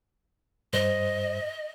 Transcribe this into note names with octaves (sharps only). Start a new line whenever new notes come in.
G2 C5 D#5